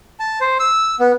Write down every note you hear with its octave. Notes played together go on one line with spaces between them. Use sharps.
A5
C5
E6
B3